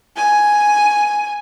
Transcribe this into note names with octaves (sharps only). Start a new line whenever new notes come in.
G#5